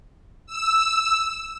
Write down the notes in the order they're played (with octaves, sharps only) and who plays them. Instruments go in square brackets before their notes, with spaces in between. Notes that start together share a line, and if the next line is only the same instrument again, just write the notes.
[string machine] E6